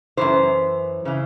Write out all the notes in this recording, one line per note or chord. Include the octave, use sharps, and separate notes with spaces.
F#2 C#3 E3 C5
C#3 E3